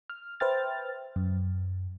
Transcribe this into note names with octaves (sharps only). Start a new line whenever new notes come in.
F6
B4 C5 E5 G5 F6 A6
F#2